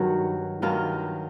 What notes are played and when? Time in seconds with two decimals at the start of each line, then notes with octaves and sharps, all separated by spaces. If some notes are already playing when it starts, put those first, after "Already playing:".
Already playing: G2 D#3 F#3 F#4
0.62 G2 D#3 F#3 F4